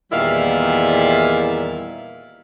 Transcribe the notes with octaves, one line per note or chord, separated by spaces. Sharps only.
E2 A#2 D#3 G3 E4 F5